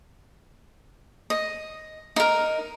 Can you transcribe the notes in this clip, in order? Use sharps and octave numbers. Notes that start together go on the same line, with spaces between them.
D#5
D#4 A#4